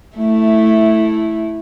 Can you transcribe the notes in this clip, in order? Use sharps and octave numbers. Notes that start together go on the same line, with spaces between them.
A3 E4